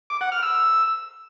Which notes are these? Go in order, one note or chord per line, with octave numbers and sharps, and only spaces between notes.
D6
F#5
F6
E6